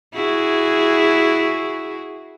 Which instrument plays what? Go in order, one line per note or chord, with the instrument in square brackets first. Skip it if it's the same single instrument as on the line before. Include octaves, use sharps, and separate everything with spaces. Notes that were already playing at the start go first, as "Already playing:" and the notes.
[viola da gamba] E4 F#4 G#4